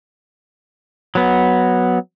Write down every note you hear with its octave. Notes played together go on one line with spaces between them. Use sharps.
F#3 B3